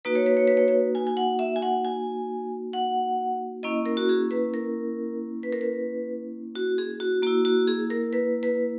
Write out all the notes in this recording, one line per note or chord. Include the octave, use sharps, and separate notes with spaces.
A#3 D#4 F#4 B4
C#5
B4
C#5
B4
C#5
B4
G#5
G#5
F#5
E5
G#5
F#5
G#5
F#5
A#3 C#4 E4 D#5
A#4
F#4
G#4
B4
A#4
B4
A#4
B4
F#4
G#4
F#4
A#3 E4 F#4
F#4
G#4
A#4
B4
B4